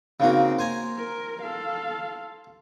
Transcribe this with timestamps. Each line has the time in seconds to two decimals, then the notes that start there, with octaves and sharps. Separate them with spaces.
0.20 C#3 A#3 C4 D#4 F#4
0.59 A#3 C5 G#5 A#5
0.98 A#4
1.42 A4 F5